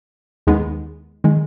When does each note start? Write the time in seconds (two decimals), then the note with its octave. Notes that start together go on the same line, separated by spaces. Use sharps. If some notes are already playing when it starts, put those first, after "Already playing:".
0.47 D#2 D#3 G#3 B3
1.24 D#3 G#3